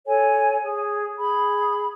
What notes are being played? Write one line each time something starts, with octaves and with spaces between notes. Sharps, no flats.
A4 C#5 G#5
G#4
G#4 B5